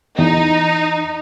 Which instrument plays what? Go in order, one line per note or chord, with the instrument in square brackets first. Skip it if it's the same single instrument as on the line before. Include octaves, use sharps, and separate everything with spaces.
[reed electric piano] E2 [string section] D#4